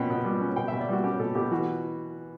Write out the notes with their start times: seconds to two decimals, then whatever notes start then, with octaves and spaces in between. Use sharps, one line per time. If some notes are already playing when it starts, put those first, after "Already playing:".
Already playing: B2 C#4 F#5 G5
0.10 B2
0.25 G3
0.41 C#4
0.56 B2 G5
0.68 B2 E5
0.81 D5
0.89 G3 F#4
1.04 C#4 G4
1.19 B2 A4
1.35 B2 G4
1.51 E3 F#4